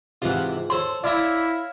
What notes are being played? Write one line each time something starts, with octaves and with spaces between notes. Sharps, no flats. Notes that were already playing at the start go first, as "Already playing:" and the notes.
G#2 C3 E3 F4 F#5
A4 C5 C#5 C6
E4 C#5 D5 E5 F5 A#6